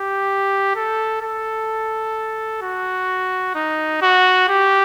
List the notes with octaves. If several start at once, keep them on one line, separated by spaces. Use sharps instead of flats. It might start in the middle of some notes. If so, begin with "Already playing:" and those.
Already playing: G4
A4
A4
F#4
D#4
F#4
G4